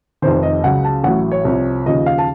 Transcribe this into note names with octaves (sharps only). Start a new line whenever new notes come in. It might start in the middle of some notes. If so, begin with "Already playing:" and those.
F1 F2 C3 D#3 C5
D#5
C#2 C#3 F#3 F#5
A5
A1 A2 F#3 F#5
C#5
C2 C3 F3
D#2 C#3 F3 D#5
F5
A5